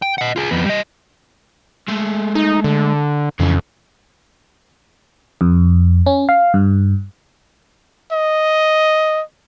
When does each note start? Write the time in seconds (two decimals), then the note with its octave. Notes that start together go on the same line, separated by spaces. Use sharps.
0.02 G5
0.18 D#5 F#5
0.36 F4 G#4
0.51 F2 B3
0.66 G3 D#5
1.89 G#3 A3
2.35 D#4
2.64 D3
3.40 F2 C#3 E3
5.41 F2
6.06 C#4
6.29 F5
6.54 G2
8.12 D#5